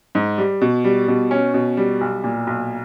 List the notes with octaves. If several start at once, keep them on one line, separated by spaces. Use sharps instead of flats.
G#2
G3
B2
G3
B2
C#4
B2
G3
B1
A#2
B1